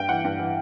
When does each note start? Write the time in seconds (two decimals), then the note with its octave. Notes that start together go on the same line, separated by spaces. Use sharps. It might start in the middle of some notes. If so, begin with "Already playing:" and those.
Already playing: G2 G5
0.09 E3 F#5
0.24 G2
0.39 E3